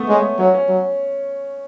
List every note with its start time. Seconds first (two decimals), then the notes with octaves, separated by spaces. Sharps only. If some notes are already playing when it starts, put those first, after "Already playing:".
Already playing: A3 B3
0.09 G#3 C#4
0.39 F#3 C#4
0.54 C#4
0.69 F#3